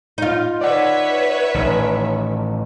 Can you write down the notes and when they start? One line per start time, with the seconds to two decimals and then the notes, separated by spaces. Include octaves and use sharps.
0.18 D#4 F4
0.61 B4 C#5 D5 E5 F#5
1.54 A1 D#3